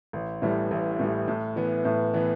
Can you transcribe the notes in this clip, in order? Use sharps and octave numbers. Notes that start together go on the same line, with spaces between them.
A1
A2 E3 G3
A1
A2 E3 G3
A2
E3 B3
A2
E3 B3